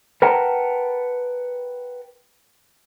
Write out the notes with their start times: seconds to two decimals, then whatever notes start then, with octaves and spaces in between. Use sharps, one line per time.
0.22 A#4 B4 F#5 G5 A5 A#5